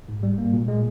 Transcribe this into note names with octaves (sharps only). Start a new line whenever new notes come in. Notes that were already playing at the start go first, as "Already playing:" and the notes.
G#2
G3
A#3
A#2
G#3